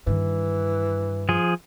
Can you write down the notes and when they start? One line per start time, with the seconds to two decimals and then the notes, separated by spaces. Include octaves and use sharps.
0.07 G2 D#3 E3
1.29 F3 G#4